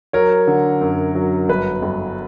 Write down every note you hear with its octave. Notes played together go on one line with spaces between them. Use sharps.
F#3 A#4 C#5
D3
F#2
F#3
G1 B4
G1